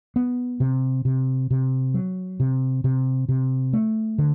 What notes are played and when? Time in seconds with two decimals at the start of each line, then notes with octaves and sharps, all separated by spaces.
0.16 B3
0.60 C3
1.05 C3
1.51 C3
1.94 F#3
2.40 C3
2.84 C3
3.29 C3
3.73 A3
4.18 D3